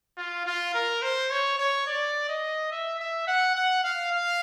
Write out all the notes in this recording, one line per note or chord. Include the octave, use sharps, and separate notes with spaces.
F4
F4
A#4
C5
C#5
C#5
D5
D#5
E5
E5
F#5
F#5
F5
F5